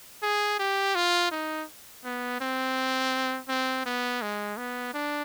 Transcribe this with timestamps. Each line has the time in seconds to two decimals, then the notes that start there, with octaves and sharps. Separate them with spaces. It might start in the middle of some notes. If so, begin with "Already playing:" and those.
0.22 G#4
0.59 G4
0.95 F4
1.31 D#4
2.04 B3
2.41 C4
3.48 C4
3.86 B3
4.22 G#3
4.57 B3
4.94 D4